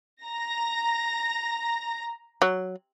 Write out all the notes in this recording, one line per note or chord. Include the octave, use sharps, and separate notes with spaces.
A#5 A#6
F#3